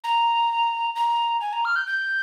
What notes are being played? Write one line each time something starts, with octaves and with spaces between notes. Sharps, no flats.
A#5
A#5
G#5
A#5
F6
G6
G6